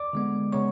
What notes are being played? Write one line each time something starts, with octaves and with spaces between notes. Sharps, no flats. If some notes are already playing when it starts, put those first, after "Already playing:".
Already playing: D5 D6
D3 G#3 B3
C#3 G#3 B3 C#5 C#6